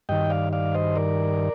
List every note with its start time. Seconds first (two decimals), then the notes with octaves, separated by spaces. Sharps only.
0.09 G2 D#3 D#5 G5
0.30 D5 F5
0.53 D5 F5
0.74 C5 D#5
0.96 A#4 D5